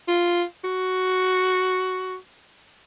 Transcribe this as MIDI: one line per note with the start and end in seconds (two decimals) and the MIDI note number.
0.08 0.43 65
0.64 2.16 66